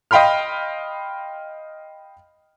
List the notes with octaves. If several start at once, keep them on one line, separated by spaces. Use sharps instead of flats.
D#5 F5 G5 B5 C6 F6